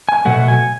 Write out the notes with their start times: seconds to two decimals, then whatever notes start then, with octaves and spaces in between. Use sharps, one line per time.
0.09 G#5
0.25 B2 F#3 A3 F#5
0.48 G#5